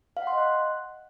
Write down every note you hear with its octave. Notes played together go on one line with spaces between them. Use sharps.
F5
F#5
C6
D#5
F#6